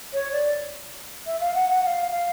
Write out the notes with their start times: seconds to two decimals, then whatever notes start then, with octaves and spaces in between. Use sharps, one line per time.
0.13 C#5
0.32 D5
1.27 E5
1.40 F5
1.55 F#5
1.69 F#5
1.83 F#5
1.87 F5
2.11 F5